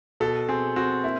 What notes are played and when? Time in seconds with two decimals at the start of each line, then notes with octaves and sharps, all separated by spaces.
0.20 B2 A4
0.49 C4 G#4
0.76 C4 F#4
1.04 A#3 E4